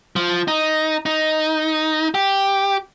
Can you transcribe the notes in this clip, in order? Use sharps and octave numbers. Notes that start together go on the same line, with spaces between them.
F3
D#4
D#4
G4